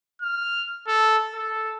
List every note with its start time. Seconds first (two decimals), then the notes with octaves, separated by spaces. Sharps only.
0.22 F6
0.87 A4
1.34 A4